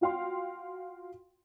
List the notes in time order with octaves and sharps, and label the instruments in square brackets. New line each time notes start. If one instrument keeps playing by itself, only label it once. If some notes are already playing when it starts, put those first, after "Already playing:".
[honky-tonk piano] F4 F#4 F5 G5 C6